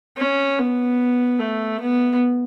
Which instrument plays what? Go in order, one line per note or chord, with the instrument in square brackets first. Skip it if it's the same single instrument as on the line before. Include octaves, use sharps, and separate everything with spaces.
[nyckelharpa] C#4
B3
A3
B3